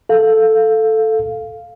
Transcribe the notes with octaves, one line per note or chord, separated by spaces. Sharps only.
A4 F5